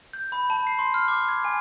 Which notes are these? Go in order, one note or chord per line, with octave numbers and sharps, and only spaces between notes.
G6
B5
A5
C7
C6
F6
D6
G#6
G#5